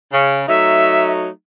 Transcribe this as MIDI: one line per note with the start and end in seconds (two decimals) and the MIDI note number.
0.13 0.42 49
0.48 1.28 54
0.48 1.28 57
0.48 1.28 63
0.48 1.11 76